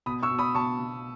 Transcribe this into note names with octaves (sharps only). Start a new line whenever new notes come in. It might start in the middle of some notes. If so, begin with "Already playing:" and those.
B2 B5 D#6
C#6 E6
B2
B5 D#6
B2 A5 C#6
B2